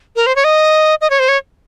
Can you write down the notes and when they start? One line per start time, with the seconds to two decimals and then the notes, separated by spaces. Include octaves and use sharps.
0.16 A#4
0.26 C5
0.36 C#5
0.44 D#5
1.01 D#5
1.10 C#5
1.19 C5
1.29 C#5